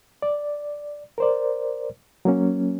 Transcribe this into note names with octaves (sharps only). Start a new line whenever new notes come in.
D5
A#4 C5 D5
F#3 A#3 C#4